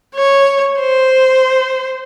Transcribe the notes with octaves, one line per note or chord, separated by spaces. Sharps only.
C#5
C5